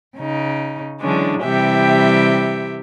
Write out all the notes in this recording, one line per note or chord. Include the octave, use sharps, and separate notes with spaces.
C#3 D#4
D3 E3 F#3 G#3 C#4 D4
C3 E3 G3 G4 E5 G5